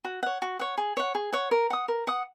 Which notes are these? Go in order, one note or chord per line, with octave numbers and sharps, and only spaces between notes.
F#4
C#5 F#5
F#4
C#5 F#5
G#4
C#5 F#5
G#4
C#5 F#5
A#4
F#5 D#6
A#4
F#5 D#6